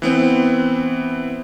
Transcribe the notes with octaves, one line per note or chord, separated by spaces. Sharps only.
E3 B3 C4